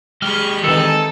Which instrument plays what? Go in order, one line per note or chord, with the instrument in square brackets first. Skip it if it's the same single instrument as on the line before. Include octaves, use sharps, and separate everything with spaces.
[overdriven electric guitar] G#3 G4 [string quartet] G#4 B5 C#6 [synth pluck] F6
[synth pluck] D#3 E3 [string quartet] C4 D#4 A5 [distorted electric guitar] A4